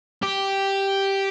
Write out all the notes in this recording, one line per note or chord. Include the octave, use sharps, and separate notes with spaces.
G4